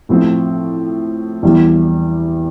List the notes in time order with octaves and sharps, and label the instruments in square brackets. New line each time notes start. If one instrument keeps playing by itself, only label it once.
[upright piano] A2 F3 C4
E2 E3 G3